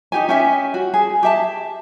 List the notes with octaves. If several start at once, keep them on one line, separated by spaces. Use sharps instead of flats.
D#4 G4 G#5
C#4 G4 E5 G#5
F#4
G#4
G4 E5 A5